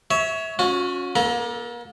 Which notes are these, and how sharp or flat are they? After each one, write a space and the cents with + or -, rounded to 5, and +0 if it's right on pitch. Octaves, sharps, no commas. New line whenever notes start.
C#5 +15 E5 -20
C#4 +0 F#4 -45
A#3 +40 A4 +5 A#5 +35